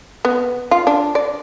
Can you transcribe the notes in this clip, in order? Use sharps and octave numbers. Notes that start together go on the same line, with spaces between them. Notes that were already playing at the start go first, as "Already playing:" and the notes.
B3
F4
D4
D5